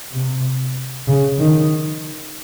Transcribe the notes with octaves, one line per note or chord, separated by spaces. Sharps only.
C3
C#3
D#3